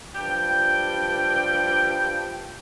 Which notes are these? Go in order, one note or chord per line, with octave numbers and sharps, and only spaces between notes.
G2 F3 G3 G5